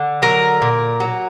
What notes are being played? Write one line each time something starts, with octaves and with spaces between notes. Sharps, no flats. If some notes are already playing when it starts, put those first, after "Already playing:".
Already playing: D3 A4
F#3 A#4
A#2
F#3